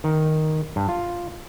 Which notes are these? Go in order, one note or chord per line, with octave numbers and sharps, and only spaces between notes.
D#3
G2
F4